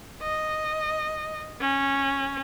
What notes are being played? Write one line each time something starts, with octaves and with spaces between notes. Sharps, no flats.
D#5
C#4